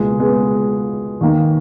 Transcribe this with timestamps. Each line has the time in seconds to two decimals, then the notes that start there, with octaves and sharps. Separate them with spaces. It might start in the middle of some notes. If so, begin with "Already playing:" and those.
Already playing: C#2 B2 G#3 A#3
0.20 G#3 B3
1.21 D#2 D#3 A#3